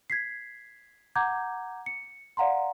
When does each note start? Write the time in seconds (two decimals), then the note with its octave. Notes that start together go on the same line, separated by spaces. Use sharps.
0.10 G#6 B6 C7
1.15 F#5 A#5 D6 G6 G#6
1.86 C#7
2.37 D5 F5 F#5 A#5 C6